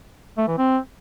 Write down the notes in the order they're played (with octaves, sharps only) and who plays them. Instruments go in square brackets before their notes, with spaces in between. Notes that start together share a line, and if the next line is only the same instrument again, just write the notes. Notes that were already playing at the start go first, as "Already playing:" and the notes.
[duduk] A3
E3
C4